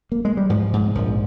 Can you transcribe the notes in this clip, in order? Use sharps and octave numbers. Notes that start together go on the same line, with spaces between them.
A#3
G#3
G3
G#2 F3
G#2
A#1 F3